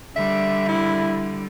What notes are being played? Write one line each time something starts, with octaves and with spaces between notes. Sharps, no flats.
D3 G3 E5
E4